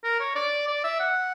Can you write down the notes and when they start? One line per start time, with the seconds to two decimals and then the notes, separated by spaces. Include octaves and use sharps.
0.04 A#4
0.20 C#5
0.36 D5
0.68 D5
0.84 E5
1.00 F#5